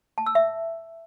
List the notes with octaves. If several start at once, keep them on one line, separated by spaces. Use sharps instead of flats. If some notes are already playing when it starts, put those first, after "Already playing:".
A5
E6
E5